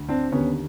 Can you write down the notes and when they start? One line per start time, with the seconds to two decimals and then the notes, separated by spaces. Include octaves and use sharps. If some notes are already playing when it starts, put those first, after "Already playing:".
Already playing: D2 D3
0.09 C4 D4
0.32 D#2 D3 B3 C#4